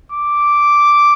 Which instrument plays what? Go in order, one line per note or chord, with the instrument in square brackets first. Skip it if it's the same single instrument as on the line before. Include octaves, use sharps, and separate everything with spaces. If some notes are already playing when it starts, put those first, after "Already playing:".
[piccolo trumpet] D6